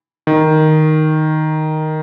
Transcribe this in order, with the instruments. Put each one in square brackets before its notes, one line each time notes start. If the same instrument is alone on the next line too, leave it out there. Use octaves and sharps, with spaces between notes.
[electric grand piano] D#3